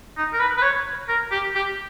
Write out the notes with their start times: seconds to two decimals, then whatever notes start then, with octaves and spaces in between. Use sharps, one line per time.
0.17 D#4
0.33 A#4
0.39 B4
0.57 B4
0.62 C#5
1.09 A#4
1.31 G4
1.55 G4